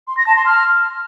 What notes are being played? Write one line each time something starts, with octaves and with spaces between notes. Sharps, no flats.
C6
A#6
A5
C6
F6